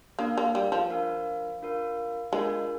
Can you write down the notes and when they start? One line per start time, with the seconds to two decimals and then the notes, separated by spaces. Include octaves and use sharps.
0.19 A#3 D4 F4 A#4 F5
0.38 A#3
0.55 G3
0.72 F3
0.90 D4 F4 A#4 F5
1.62 D4 F4 A#4 F5
2.32 G#3 D4 F4 A#4 F5